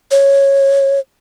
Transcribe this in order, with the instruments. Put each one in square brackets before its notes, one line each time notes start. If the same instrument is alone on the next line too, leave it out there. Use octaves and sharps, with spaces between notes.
[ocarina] C#5